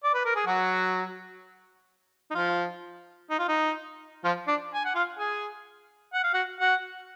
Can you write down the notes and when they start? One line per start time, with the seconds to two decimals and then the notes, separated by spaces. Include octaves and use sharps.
0.04 D5
0.14 B4
0.25 A#4
0.36 G#4
0.46 F#3 F#4
2.31 D#4
2.35 F3 F4
3.30 D#4
3.39 F4
3.48 D#4
4.24 F3 F4
4.48 D4 D5
4.75 G#5
4.85 F#5
4.95 F4 F5
5.19 G#4 G#5
6.14 F#5
6.24 F5
6.34 F#4 F#5
6.60 F#4 F#5